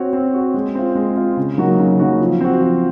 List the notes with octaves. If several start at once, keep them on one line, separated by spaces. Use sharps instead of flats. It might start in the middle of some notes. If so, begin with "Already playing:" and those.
Already playing: C4 F#4 C#5
C4
F#4 C#5
G#3
C4 F4
G#3
C4 F4
C#3
F#3 A#3 D#4 F#4
C#3
F#3 A#3 D#4 F#4
F3
C4 F#4
F3